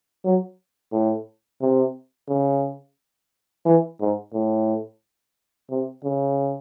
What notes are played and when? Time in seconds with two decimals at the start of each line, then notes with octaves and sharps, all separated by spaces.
0.24 F#3
0.92 A2
1.61 C3
2.29 C#3
3.65 E3
4.00 G#2
4.33 A2
5.70 C3
6.04 C#3